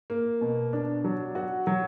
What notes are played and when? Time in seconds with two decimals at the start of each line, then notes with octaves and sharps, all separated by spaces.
0.10 A#3
0.41 B2
0.73 D4
1.04 F#3
1.35 F#4
1.67 F#3